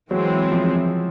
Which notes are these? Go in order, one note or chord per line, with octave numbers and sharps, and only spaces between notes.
E3 F#3 G#3 C4
F3